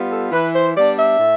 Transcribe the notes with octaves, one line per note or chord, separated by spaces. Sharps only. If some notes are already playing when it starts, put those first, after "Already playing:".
Already playing: G3 B3 F4
A4
E3 B4
C5
G3 B3 D4 D5
E5
A2